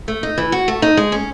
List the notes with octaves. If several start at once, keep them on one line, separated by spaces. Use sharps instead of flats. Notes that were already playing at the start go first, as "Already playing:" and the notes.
A3
D#4
E3
F#4
A3
D#4
G#3
C#4